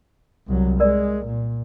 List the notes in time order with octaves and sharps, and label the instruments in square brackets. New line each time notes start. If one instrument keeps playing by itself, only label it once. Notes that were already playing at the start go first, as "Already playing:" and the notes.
[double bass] C2 F#3
[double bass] G#3 [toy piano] A#4 D5
[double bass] A#2